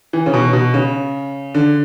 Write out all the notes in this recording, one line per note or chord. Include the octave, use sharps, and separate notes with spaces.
E3
C#3
B2
B2
C#3
D3